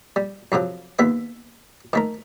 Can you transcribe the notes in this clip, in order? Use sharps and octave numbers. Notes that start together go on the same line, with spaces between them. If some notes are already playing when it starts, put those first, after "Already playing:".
G3
F2 C3 F3 F#3
D#2 B3 E5
D#3 A3 A#4